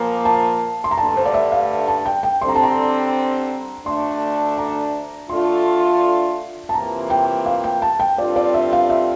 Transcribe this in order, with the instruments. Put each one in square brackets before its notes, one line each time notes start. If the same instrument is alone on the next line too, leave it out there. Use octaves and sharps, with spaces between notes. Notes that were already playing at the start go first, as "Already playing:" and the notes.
Already playing: [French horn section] A#2 F3 A#3
[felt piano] A5
C6
A#5
[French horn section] G2 D3 A3 [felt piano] A5
[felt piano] C5
D5
E5
F5
A5
G5
G5
[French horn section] D3 G3 C4 [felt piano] C6
[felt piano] A#5
A5
A#5
[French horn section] D2 D3 A3 D4 [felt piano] C6
[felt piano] A#5
[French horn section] D3 A3 D4 F4 [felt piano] C6
[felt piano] A5
[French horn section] C3 E3 A#3 F4 [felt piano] A#5
[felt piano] G5
F5
G5
A5
G5
[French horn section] G2 D3 G3 C4 F4 [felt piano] D5
[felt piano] D5
E5
F5
E5